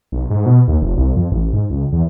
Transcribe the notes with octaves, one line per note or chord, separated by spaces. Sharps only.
B1
G#2
B2
D#2
F1
C2
F2
A1
G#2
C#2
E2